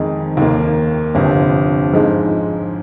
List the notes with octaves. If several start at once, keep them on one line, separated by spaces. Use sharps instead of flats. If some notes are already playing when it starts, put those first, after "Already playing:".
Already playing: F2 D#3 G#3 D#4
D#2 D#3 A#3
G1 F2 C3
G#2 F3 G#3 D#4